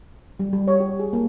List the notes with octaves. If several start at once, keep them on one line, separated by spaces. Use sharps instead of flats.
G3
G3
C#5
G4
G#4
A#3